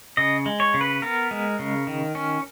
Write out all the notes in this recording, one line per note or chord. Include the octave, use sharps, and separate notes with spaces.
C#3 D#5
G#3
C#5
C#3
B4
B3 A#4
G#3
C#3
D#3
C#4